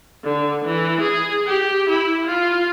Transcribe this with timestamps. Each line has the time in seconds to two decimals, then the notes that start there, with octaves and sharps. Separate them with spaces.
0.24 D3
0.65 E3
1.01 G#4
1.46 G4
1.89 E4
2.26 F4